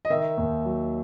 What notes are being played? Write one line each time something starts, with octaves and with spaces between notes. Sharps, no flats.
D#5
D#3 E5
D#2
F#3